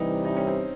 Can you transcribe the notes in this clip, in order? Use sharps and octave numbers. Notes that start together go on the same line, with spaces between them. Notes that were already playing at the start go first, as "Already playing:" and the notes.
Already playing: C3 E3 G3 D#4
D#4
C#4
C4